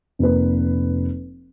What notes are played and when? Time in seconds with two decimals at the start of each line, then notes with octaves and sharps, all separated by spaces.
0.19 F1 A#3 B4